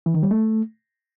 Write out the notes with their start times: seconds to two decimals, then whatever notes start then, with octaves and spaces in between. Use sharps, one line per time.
0.06 E3
0.14 D#3
0.23 G3
0.31 A3